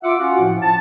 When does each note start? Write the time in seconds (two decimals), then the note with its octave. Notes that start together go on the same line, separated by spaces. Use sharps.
0.03 F4 E5 F#5 D6
0.19 C#4 F4 F#4 F#5
0.39 A2 F3
0.62 A5